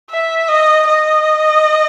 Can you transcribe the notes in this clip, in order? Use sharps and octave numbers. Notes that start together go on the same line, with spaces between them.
E5
D#5
D#5